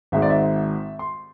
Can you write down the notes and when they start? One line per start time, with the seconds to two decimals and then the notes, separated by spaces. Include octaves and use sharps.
0.12 G#1 G#2 G#3 E5
0.22 D5
0.30 E5
0.99 C6